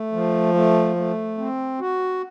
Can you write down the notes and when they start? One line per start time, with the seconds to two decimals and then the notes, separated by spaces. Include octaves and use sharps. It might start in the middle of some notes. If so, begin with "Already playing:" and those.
Already playing: A3
0.12 F3
0.54 A3
0.96 A3
1.38 C4
1.80 F#4